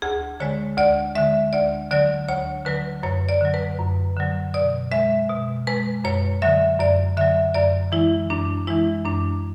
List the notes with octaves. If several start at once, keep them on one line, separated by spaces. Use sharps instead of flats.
D2 G#4
D3 G#3 C#5
D2 D5
D3 G#3 E5
D2 D5
D3 F#3 D5
D2 C#5
D3 F#3 B4
F#2 C#5
D5
D3 F#3
B4
F#2
D3 F#3
B2 D5
G#3 E5
B2
G#3 B4
F#2 C#5
D3 F#3 E5
F#2 D5
D3 F#3 E5
F#2 D5
E3 G#3 E4
F#2 D4
E3 G#3 E4
F#2 D4